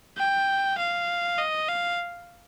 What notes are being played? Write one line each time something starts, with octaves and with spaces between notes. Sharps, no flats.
G5
F5
D#5
F5